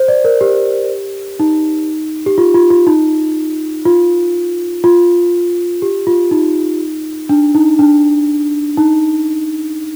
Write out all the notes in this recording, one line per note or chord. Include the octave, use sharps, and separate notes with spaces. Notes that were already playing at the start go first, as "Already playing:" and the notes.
Already playing: C5
D5
A#4
G4
D#4
G4
F4
F4
F4
D#4
F4
F4
G4
F4
D#4
D4
D#4
D4
D#4